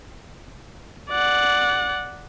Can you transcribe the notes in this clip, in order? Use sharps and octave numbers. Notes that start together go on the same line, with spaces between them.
D5 F#5